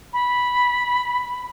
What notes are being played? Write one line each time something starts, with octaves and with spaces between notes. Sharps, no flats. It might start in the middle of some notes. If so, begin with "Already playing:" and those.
B5